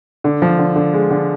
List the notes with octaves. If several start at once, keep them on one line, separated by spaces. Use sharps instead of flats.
D3
F3
D3
D3
G#3
D3